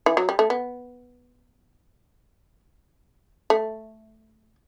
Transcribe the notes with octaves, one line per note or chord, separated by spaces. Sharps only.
E3
F#3
G3
A3
B3
A3